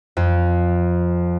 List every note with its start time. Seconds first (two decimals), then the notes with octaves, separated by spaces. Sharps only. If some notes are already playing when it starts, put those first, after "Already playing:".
0.17 F2